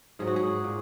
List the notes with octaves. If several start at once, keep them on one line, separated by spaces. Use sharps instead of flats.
G#2 F#3 G#4
F#4
G#4
A#2